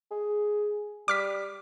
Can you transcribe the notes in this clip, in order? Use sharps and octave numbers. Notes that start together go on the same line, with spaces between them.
G#4
G3 D6 F6 B6